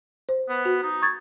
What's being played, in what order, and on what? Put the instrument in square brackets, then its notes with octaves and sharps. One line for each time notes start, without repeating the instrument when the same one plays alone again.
[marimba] C5
[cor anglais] B3
[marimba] F#4
[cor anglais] D#4
[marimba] C#6 G#6 A6